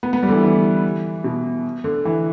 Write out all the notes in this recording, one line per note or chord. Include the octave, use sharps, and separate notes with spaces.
B3
B3
G3
D3
E3
E3
B2
D3
E3